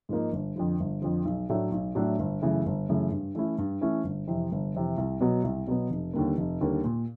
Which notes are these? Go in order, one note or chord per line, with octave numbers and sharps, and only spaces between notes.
G#2 F3 A#3 D#4
G1
F2 D3 F3
G1
F2 D3 F3
B1
A2 F#3 A3 D4
B1
A2 F#3 A3 D4
G1
F#2 C#3 E3 A3
G1
F#2 C#3 E3 A3
G2
E3 A3 C#4 E4
G2
E3 A3 C#4 E4
G1
F2 C3 E3
G1
F2 C3 E3
C2
B2 F#3 B3
C2
B2 F#3 B3
F1
D#2 D3 G3 A#3
F1
D#2 D3 G3 A#3
A#2